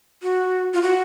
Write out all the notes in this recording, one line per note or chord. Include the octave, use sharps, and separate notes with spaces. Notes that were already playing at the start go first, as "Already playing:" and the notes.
F#4
F4
F#4